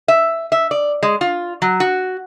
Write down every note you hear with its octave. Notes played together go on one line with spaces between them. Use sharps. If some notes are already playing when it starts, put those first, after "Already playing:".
E5
E5
D5
G#3
F4
F#3
F#4